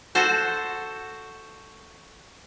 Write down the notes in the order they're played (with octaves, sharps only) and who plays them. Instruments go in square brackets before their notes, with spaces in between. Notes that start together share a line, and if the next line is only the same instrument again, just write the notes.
[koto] F#4 A4 C5